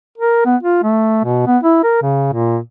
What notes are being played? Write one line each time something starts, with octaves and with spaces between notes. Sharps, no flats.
A#4
B3
F4
A3
B2
B3
E4
A#4
C#3
A#2